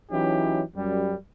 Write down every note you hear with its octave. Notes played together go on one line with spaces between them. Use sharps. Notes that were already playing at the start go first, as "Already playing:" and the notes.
E3 F#3 C#4 D#4 E4 G4
F#2 G3